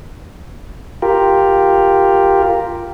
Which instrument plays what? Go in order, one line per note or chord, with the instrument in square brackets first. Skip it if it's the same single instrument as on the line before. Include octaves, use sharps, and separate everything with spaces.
[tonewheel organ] F4 G4 A#4